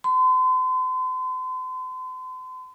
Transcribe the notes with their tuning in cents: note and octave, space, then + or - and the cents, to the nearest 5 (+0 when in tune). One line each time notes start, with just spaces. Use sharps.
C6 -40